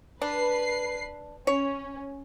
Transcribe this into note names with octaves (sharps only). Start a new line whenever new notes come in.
D4 B4 C7
C#4 C#5